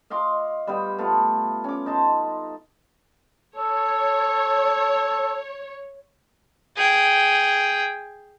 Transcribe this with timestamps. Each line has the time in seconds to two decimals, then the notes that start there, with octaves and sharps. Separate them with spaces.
0.10 D#5 F5 C6 D6
0.67 G3 B3 F5 G5
0.98 A3 B3 F4
1.64 C#4 D6
1.86 D#4 A5 C6
3.56 A4 C#5
6.77 G#4 G5